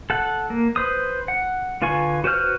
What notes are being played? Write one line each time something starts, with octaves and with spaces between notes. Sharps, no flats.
A4 F#5
A#3
B4 C5 D#6
F#5
D3 F4 B4 G#5 C#6
F#4 B4 C5 F6 F#6